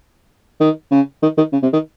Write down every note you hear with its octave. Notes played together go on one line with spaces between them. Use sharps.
D#3
C#3
D#3
D#3
C#3
C3
D#3